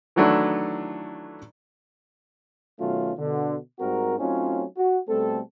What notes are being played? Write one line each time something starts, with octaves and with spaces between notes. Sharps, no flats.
D#3 E3 F#3 A3 D4 E4
B2 D#3 F#3 A3 C#4 F4
B2 D3
G#2 G3 C4 F#4 A#4
F#3 A3 C4 C#4 D#4 F4
F#4
B2 G3 A3 C4 A4